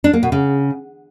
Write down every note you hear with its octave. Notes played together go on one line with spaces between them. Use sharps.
D4
A#3
B2
C#3